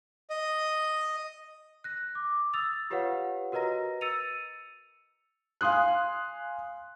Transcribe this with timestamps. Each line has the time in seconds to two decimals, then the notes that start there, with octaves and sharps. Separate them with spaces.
0.30 D#5
1.84 F#6 A#6
2.15 D6
2.54 D#6 E6 A6 F7
2.90 F4 G4 B4 C#5 F5 F#5
3.52 F#4 A#4 B4 D#5 A#5 A#6
4.01 E6 A6 C#7 D#7 F7
5.61 F5 G#5 C6 D#6 F#6